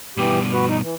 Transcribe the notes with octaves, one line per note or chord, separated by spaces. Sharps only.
G2 B2 E3 G4
F#4 B4
D#4
E3